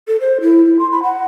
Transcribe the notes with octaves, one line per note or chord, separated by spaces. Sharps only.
A4
C5
E4
E4
C6
B5
F#5